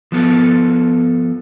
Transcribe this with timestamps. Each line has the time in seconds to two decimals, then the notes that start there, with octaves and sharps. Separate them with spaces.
0.12 F3 B3 A4